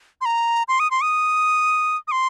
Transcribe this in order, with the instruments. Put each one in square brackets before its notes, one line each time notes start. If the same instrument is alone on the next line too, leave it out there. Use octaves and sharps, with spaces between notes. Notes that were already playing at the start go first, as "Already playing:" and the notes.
[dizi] C6
A#5
C6
D#6
C6
D#6
D#6
C6